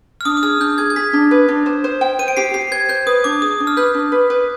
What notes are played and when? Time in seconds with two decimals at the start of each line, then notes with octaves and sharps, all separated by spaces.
0.21 F6
0.25 D4 D#6
0.37 D#6
0.43 G#4 F6
0.60 D4 G6
0.78 G#4 G#6
0.90 G#6
0.96 G#4 B6
1.13 D4
1.31 B4
1.48 D4
1.66 C5
1.84 C5
2.01 G5
2.19 C5 D#7
2.28 D7
2.37 G4 C7
2.54 G4 C7
2.71 C5 G#6
2.89 C5 G6
3.06 B4 D#6
3.24 D4 D6
3.42 G#4 D#6
3.60 D4
3.67 F6
3.77 B4 G6
3.94 D4
4.12 B4
4.30 B4